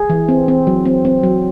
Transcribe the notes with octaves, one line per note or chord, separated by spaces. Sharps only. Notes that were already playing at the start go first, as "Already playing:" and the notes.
Already playing: G#4
E3
C4
C4
F#3
C4
C4
F#3